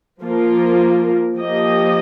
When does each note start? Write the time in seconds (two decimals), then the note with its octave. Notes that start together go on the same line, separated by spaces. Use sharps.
0.23 F3 A#3 F4 A#4
1.36 F3 A#3 G4 D#5